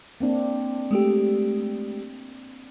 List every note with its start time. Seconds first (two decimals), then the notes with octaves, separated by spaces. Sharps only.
0.20 A#3 C4 D4
0.91 G#3 A3 G4